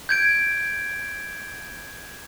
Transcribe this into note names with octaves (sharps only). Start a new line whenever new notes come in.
G6 G#6 D7